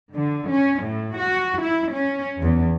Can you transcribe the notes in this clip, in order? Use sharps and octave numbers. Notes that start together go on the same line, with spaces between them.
D3
C#4
A2
F#4
E4
C#4
E2